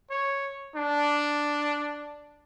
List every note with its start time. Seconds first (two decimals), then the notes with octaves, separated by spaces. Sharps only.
0.10 C#5
0.76 D4